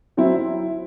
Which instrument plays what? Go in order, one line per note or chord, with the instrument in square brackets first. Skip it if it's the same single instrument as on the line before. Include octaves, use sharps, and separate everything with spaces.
[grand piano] F#3 C4 E4